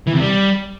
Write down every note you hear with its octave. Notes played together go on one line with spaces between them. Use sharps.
E3
C3
G3